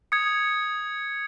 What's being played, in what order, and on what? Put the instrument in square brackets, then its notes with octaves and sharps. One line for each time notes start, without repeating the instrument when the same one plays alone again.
[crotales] D#6 G#6 C#7